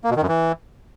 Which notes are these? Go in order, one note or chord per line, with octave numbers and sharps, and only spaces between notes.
A#3
B2
D#3
F#2
E3